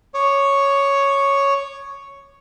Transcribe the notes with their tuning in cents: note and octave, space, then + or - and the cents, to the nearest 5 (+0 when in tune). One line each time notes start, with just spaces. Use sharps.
C#5 +0 D6 +40